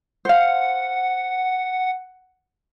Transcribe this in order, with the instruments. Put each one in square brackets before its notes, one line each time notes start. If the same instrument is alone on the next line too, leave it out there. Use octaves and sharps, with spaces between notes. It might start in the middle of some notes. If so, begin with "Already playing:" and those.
[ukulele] C5 F5 [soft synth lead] F#5